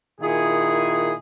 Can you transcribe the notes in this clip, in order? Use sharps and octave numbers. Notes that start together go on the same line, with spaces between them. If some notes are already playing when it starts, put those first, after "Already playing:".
A#2 D#3 E4 G#4